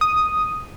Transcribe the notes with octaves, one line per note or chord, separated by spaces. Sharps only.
D#6